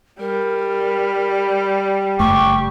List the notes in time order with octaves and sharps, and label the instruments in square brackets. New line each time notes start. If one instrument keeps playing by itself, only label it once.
[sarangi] G3 [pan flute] A#4
[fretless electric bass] F#1 G2 A3 [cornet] G4 [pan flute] C#6